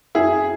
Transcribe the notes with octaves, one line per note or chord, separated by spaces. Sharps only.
F#2 E4 G#4